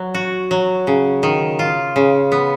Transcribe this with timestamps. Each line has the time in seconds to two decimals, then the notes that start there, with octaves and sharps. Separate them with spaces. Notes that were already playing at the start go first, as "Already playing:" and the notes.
Already playing: F#3
0.14 F#4
0.51 F#3
0.87 C#3
1.23 D#3
1.59 F4
1.96 C#3
2.32 B3